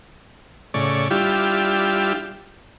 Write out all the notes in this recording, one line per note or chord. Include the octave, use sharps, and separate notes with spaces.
A2 C#3 D5 C#6
G3 D4 E4 F4 G4